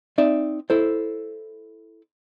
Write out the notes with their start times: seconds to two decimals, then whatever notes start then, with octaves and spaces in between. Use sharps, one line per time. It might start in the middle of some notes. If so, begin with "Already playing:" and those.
0.18 C4 D#4 D5 E5
0.70 E4 A4 C5